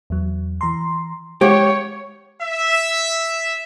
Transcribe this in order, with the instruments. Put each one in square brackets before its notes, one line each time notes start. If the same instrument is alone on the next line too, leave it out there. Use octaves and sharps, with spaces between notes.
[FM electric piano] E2 F#3
E3 A#5 C6
[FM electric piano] G#3 F5 F#5 [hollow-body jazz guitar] G4 [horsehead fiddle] C#5
[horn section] E5